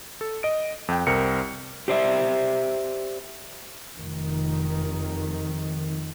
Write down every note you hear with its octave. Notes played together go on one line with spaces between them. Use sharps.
A4
D#5 D7
F2 G5
C2 C4 A#4 C#7
G4 C5 D5 E5
F1 D#3